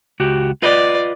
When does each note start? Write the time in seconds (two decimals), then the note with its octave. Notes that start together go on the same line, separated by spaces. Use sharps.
0.20 C#2 F#4 G4
0.62 F4 B4 D5 D#5